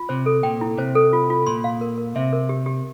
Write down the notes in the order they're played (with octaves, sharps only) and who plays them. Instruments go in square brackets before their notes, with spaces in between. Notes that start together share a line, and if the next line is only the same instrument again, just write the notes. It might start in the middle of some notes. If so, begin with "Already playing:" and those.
Already playing: [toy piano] F4
[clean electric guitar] C3 [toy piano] C5
[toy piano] A4
[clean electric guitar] A#2 [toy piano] G5
[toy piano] E4
[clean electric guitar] C3 [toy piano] C5
[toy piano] A4
F4
F4
[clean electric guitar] A#2 [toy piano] C6
[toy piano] F5
A#4
A#4
[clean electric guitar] C3 [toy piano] E5
[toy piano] A#4
G4
G4